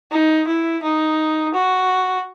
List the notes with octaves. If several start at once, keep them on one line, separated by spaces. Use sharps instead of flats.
D#4
E4
D#4
F#4